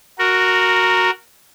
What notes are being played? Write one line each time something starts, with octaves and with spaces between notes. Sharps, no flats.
F#4 A#4